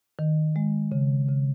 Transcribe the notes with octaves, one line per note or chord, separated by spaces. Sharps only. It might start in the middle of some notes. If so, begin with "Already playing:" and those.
D#3
G#3
C#3
C#3